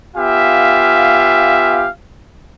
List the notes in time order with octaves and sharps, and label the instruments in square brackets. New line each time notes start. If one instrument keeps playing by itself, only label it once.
[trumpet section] B3 F4 G4 E5 F5 G#5